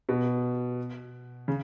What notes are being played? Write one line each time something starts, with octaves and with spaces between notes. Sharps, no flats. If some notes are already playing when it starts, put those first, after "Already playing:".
B2
C#3